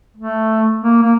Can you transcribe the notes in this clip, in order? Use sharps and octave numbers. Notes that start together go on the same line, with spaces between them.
A3
A#3
A#3